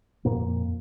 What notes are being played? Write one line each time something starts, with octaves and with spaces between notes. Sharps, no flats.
F2 A#2 A#3